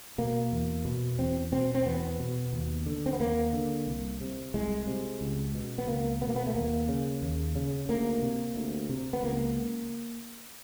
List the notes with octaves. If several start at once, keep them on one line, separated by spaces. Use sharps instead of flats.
B2 A#3
E2
B2
E2 C4
B2 C4
C4
E2 B3
B2
D#2
D3
C4
B3
D#2 A#3
D3
C2
C3
C2 G#3
C3
C#2
B2
B3
C#2 A#3
B2 B3
A#3
B3
A3
D#2 A#3
C#3
D#2
C#3
D2 A#3
C3
D2
C3
B3
C#2 A#3